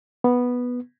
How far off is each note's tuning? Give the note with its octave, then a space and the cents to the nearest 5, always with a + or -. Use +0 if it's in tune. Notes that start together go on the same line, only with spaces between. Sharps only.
B3 -5